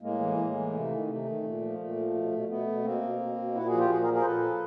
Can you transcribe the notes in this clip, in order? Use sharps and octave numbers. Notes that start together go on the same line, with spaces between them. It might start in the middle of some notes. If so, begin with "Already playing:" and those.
A2 G#3 A#3
E3
A2
E3
C3 A3
D#3
C3 A3
D#3
A#2
F3
A#2 A3
F3
B2
B2
B2 A3 B3
B2
B2 A#3 C4
B2
B2
B2
A#2 E4 F#4
F#4 G#4
F3
F4 G4
A#2 F#4 G#4
G#4 A#4
F3
G#4 A#4
C5
A#2 A4 B4
F3